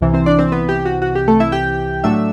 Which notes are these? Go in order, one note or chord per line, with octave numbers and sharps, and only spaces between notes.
C2 C3 E3
C4 C5
D4 D5
C4 C5
B3 B4
G4
F#4
F#4
G4
A3 A4
E4 E5
G4 G5
A2 F#3 A3 D4 E5 E6